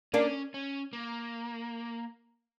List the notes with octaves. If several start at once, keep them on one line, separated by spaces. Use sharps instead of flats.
A#3 C#4 D4
C#4
A#3